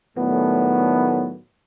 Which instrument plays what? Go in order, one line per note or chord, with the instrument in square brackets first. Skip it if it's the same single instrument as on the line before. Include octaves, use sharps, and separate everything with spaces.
[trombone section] A2 D#3 F#3 G3 A3 B3